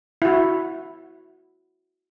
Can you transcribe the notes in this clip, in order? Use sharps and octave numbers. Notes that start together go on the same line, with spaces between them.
E4 F#4